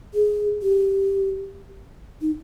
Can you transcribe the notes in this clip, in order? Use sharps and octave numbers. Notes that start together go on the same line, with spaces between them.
G#4
G4
D#4